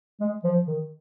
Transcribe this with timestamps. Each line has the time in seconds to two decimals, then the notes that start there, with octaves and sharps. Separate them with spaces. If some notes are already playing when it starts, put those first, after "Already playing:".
0.21 G#3
0.44 F3
0.67 D#3